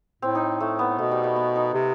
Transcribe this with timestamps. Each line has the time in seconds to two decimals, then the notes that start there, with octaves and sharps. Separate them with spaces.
0.22 A2 C4
0.35 D#4
0.60 A2 A3
0.79 B3
0.98 B2 A3
1.11 G3
1.24 A3
1.36 B3
1.55 D#4
1.74 C3